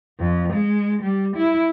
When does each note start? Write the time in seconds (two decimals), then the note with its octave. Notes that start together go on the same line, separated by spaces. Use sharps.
0.20 F2
0.53 G#3
1.03 G3
1.36 E4